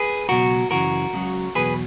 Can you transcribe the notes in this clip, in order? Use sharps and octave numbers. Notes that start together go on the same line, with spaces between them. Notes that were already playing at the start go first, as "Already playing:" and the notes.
Already playing: G#4 B4
C#2 B2 F#3 F#4 A#4
F#2 C#3 E3 F#4 A#4
C#2 C#3 F#3
E2 B2 F#3 G#4 B4